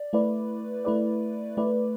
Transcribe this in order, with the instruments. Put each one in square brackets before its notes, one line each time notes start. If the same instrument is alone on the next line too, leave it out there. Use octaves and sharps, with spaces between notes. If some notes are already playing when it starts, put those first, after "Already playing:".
Already playing: [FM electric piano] D5
A3 E4 B4 D5
A3 E4 B4 D5
A3 E4 B4 D5